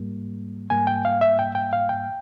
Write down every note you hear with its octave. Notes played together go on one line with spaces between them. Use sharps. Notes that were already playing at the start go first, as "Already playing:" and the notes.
Already playing: G#2 G3 A#3
G#2 G3 A#3 G#5
G5
F5
E5
G5
G5
F5
G5